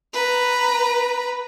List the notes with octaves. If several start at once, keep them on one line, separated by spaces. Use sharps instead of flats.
B4 A#5